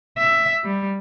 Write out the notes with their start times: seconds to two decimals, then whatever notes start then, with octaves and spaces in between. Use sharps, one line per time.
0.18 E5
0.64 G3